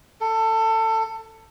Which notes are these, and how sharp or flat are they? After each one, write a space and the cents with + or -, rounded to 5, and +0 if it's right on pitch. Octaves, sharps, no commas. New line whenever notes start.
A4 +20